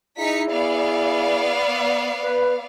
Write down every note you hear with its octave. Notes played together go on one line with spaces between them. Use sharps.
D#4 E4 G#4 B6 C#7
B3 D5 F5
B4